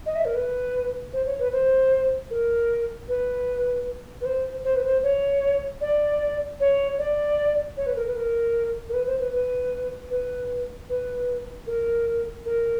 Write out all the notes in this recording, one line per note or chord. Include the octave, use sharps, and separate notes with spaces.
D#5
E5
A#4
B4
C5
C#5
B4
C5
A#4
B4
B4
C5
C5
B4
C5
C#5
D5
C#5
D5
C#5
B4
A#4
B4
A#4
A#4
B4
C5
B4
B4
B4
B4
A#4
A#4